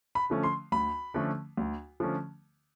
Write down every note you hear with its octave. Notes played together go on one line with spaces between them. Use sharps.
B5
D3 F3 A3 C#4
C6
D2 B5
D3 F3 A3 C#4
D2
D3 F3 A3 C#4